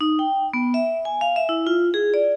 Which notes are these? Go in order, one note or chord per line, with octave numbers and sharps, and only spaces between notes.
D#4
G5
B3
E5
G#5
F5
E5
E4
F4
G#4
D5